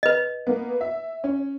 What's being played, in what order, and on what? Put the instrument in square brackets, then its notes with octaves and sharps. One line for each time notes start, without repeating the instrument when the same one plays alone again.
[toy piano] B4 D#5
[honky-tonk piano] A#3 B3
E5
C#4